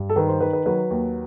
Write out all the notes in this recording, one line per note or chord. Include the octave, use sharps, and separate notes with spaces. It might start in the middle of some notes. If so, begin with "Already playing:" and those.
Already playing: G2
A4
D#3 B4
C5
D#3 B4
B4
F#3 B4
D#2